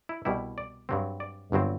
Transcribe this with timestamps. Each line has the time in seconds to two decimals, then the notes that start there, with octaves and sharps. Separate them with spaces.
0.09 E4
0.25 C2 B2 G3 E4
0.58 D5
0.89 G2 F#3 C4
1.20 D5
1.52 G1 G2 F#3 C4